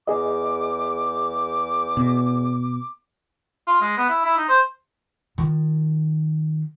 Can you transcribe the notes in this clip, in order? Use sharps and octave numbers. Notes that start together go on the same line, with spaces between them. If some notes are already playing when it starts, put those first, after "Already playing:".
E2 G#4 D#5 D6
B2
F4
G#3
B3
E4
E4
D#4
C5
D#3 F3